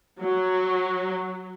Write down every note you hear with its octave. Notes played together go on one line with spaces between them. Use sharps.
F#3